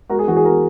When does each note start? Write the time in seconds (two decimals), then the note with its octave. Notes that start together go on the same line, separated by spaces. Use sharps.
0.09 G#3 F#4 A#4
0.19 G#4
0.28 E3 F#4
0.36 G#4
0.45 F#4 A#4